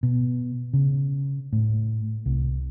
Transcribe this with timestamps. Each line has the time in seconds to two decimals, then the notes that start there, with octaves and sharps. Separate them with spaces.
0.03 B2
0.73 C#3
1.53 A2
2.26 C2